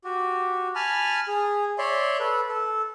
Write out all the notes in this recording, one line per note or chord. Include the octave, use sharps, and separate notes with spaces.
F#4 G4
G#5 A5 B5 F6
G#4
C#5 D5 E5 C6
A4 B4
A4